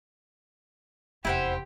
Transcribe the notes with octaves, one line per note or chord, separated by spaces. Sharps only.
F1 E2 E4 G4 C5 F#5